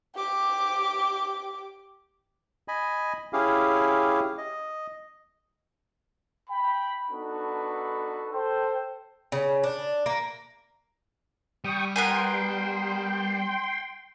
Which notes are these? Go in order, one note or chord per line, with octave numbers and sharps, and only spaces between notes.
G4 D6
D#5 G#5 B5
C#4 E4 G4 G#4 F5
D#5
G5 B5
B3 D4 D#4 F#4 A4 B4
A4 C5 G5
C#3
D4
A#3
G3 G5 C#6 D#6
B3 A#4 G5 G#5 C6